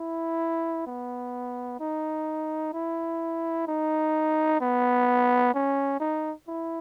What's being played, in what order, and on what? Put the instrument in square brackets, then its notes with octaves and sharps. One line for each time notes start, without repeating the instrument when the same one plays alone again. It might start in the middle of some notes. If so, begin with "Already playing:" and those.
Already playing: [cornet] E4
B3
D#4
E4
D#4
B3
C#4
D#4
E4